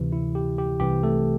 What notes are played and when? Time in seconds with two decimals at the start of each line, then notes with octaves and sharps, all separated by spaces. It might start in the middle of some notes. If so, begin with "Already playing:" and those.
Already playing: D2 C3 E3
0.12 E4
0.35 G4
0.58 G4
0.80 C2 C3 E3 G4
1.03 A3 A4